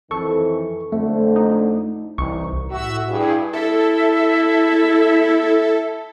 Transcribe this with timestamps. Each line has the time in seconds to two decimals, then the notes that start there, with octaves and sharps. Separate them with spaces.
0.11 F2 D#3 E3 A4 C#6
0.92 F2 D3 A3
1.36 D#4
2.18 C2 E3 D#4 C#6
2.71 A2 F#4 E5 E6
3.09 G2 E4 G#4
3.53 E4 A4 E5